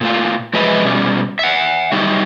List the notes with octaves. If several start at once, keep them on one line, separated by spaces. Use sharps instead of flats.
A#2 A3 F4
F3 F#3 G#3 B4 D#5 E5
B2 G3 C#4
E5 F#5
F#3 G3 D#4 E5